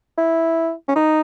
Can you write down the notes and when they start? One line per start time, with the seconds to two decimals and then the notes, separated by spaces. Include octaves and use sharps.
0.18 E4
0.88 C#4
0.95 D#4